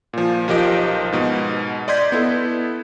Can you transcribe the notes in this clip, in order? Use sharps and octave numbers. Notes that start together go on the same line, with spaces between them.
A#2 F3
B1 F3 G4 A#4 D#5 D7
G#2 B2
D5 D#5 C6 G6 G#6 B6
B3 E4 A4